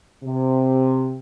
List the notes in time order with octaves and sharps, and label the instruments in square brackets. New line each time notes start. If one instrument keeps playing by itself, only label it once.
[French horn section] C3